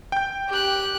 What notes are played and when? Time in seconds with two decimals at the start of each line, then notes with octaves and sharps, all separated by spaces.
0.12 G5 G6
0.49 G4 F#6